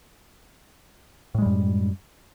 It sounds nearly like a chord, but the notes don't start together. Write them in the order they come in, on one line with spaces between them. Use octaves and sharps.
A2 G#3 G3 F#2